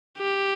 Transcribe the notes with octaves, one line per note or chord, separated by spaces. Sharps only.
G4